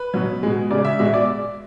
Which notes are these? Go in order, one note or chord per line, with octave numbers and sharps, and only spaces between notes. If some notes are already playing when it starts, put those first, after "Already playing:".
Already playing: B4
B2 F#3
B2 G#3
C#3 G#3 D5
E5
B2 G#3 E5
D5